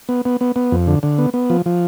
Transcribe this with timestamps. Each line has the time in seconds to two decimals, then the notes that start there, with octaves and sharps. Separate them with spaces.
0.09 B3
0.25 B3
0.41 B3
0.56 B3
0.72 F2
0.87 D3
1.03 D3
1.19 B3
1.34 B3
1.50 F3
1.66 F3